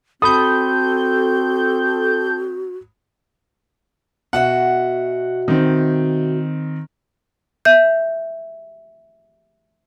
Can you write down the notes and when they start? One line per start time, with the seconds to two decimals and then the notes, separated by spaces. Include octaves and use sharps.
0.22 C4 F#4 A4 B5 D#6 G6
4.33 B2 F#4 E5 F#5
5.48 D#3 C4
7.65 E5 G6